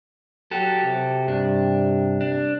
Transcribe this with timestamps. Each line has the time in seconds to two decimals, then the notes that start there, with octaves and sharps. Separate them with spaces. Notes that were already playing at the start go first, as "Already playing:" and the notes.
0.51 F#3 F#4 G4 A4
0.83 C3
1.27 G2 D4
2.21 D4